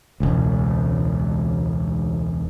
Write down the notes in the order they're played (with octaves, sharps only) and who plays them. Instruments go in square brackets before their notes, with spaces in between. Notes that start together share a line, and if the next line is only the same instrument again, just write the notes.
[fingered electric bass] E1 C#2